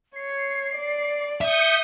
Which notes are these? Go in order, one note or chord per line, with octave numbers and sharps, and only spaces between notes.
C#5 C7
D5
E5 D#6 G6 C#7